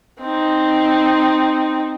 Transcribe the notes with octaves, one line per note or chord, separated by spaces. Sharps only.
C4 D#4